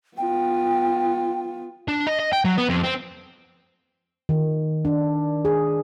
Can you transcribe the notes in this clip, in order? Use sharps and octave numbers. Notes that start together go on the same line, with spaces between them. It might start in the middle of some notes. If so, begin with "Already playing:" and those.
B3 F4 G5
D4
D#5
D#5
G5
F#3
B3
F2
C4
D#3
D4
G#4